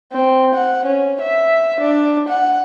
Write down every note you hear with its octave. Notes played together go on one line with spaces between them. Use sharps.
C4
F#5
C#4
E5
D4
F#5